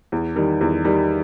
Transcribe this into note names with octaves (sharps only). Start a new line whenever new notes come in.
E2
D#3 G3
E2
D#3 G3